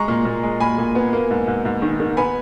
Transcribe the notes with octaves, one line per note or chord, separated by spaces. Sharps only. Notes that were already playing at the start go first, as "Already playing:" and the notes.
Already playing: G#3 A#5 C#6
A#2
A#2
G#3
A#2 G#5 B5
A#2
B3
A#3
G#2
G#2
G#2
D#3
D#3
B3 G#5 B5